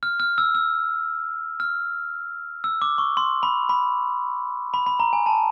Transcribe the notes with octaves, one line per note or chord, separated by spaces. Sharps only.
F6
F6
E6
E6
F6
E6
D6
C#6
C6
B5
B5
B5
B5
A#5
G#5
A5